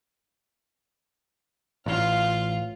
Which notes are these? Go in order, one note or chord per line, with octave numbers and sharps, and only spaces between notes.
A1 F4 F5